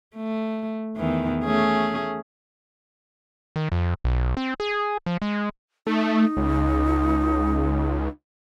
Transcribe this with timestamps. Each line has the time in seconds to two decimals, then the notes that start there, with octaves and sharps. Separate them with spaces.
0.16 A3
0.96 E2 D#3 E3
1.44 A3 C#4 G#4
3.56 D#3
3.72 F2
4.04 B1
4.37 C4
4.60 G#4
5.06 F3
5.22 G#3
5.87 A3 D#4
6.37 C#2